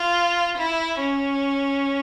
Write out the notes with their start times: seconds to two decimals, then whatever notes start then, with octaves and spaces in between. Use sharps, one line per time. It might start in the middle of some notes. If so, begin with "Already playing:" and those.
Already playing: F4
0.57 E4
0.99 C#4